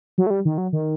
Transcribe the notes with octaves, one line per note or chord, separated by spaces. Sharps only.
F#3
A3
G3
D#3
F#3
D#3